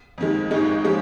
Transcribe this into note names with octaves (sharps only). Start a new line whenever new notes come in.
F2 D#3 G#3
G#1 G#2 D#3 G#3 D#4
F3 G#3 C#4